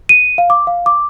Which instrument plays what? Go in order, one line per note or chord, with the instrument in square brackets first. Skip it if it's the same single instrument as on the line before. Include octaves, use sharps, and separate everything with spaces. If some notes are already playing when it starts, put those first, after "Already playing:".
[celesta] D#7
F5
D6
F5
D6